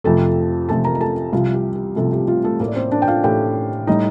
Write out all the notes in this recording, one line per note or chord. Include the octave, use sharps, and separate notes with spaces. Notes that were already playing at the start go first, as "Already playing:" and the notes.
F2 C3 F3 A3 A4 A5
F2 C3 F3 A3 A4 A5
A#4 A#5
A#5
A4 A5
C2 C3 F3 F4 F5
G4
G4
C2 C3 F3 A3 A4
G4
F4
A3 A4
A2 A3 A#3 A#4
D5
C4 C5
D4 D5
G5
F4 F5
A2 A3 G4 G5
A2 G3 D#4 D#5